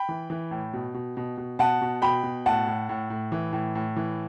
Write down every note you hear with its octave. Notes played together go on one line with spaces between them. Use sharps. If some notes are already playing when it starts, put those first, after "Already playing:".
Already playing: G5 B5
E3
E3
A2
B2
B2
B2
B2
B2 F#5 A5
B2
B2 G5 B5
B2
A2 F#5 A5
A2
A2
A2
E3
A2
A2
E3